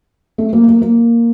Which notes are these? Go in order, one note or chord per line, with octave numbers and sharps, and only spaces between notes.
A3
A#3
A#3
A#3